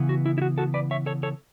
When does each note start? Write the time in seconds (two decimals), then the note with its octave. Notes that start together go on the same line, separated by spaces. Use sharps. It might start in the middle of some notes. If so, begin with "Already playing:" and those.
Already playing: C#3 E3 B3
0.09 F#4
0.26 E4
0.38 E4
0.42 F#4
0.58 F#4 A4
0.74 B4 D5
0.91 C#5 E5
1.06 A4 C#5
1.23 A4 C#5